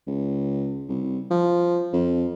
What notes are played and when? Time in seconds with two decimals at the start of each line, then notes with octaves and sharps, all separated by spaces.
0.07 C#2
0.89 C2
1.31 F3
1.93 F2